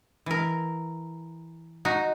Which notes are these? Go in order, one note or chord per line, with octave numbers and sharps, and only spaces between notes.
E3 A#4
D#4 F#4